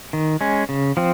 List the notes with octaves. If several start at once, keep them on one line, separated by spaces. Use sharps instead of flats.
D#3
G#3 C#4
C#3
F3 C4